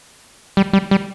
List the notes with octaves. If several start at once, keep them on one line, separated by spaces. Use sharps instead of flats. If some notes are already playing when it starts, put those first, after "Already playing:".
G3
G3
G3